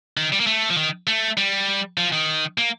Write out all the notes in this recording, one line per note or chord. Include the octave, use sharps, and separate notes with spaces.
D#3
G3
A#3
A3
F3
D#3
A3
G3
F3
D#3
A#3